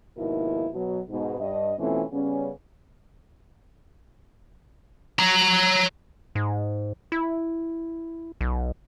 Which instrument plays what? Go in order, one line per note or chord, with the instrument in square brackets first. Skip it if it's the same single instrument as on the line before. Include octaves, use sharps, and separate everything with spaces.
[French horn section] D#2 G#2 B2 F3 E4 A#4
B2 F#3
G#2 B2
G2 D#5
B2 E3 A3 C4 C#4 F4
C#3 G3 B3 C#4
[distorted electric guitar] C#5 A#5
[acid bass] G#2
E4
B1